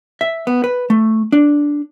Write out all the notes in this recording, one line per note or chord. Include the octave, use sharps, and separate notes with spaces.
E5
B3
B4
A3
D4